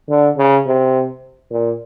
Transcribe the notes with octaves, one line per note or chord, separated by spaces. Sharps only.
D3
C#3
C3
A#2